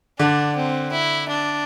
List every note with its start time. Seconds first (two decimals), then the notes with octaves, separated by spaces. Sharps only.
0.19 D3 D4
0.56 C4
0.92 E4
1.29 D4